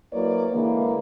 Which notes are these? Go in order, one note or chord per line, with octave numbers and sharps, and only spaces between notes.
F#3 A#3 E4 B4 C#5 D5
D3 E3 G#3 A#3